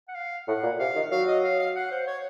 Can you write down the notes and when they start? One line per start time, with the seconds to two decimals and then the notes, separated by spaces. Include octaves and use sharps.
0.08 F#5
0.15 F5
0.48 A2 F#5
0.64 A#2
0.79 C3 F5
0.95 D#3
1.11 F#3 F5
1.28 D#5
1.44 F5
1.59 F5
1.76 F#5
1.91 C5
2.07 C#5